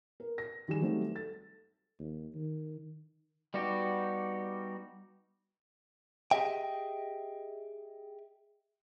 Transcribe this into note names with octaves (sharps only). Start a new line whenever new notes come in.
A#4
A#6
D#3 G3 G#4 E7
F#3 G3 A3 C4 D#4
A4 A6
D#2
D#3
G3 B3 D#4 F#4 G4
G4 G#4 D#5 E5 G5